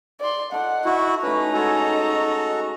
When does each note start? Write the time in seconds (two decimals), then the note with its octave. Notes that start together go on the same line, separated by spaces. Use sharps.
0.20 D5 C6
0.52 D#4 A4 D5 F#5
0.85 E4 F#4 F5 C#6
1.23 A3 C#4 D#4 B4 A#5
1.54 G#3 F#4 A4 G#5